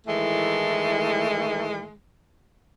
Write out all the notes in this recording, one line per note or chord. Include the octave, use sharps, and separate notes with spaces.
A2 D#3 E3 G#3 A3